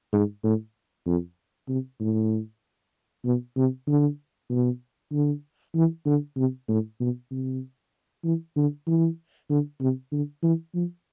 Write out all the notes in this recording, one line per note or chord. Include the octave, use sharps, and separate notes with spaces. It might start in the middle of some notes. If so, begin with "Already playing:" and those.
G#2
A2
F2
C3
A2
B2
C3
D3
B2
D3
E3
D3
C3
A2
B2
C3
E3
D3
E3
D3
C3
D3
E3
F3